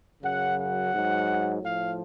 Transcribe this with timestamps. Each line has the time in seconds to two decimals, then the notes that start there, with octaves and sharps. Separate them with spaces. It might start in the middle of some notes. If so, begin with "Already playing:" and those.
0.23 F#2 C#3 F#3 F#5
0.59 F#5
0.94 G#2 F#3
1.62 A2 F3 F5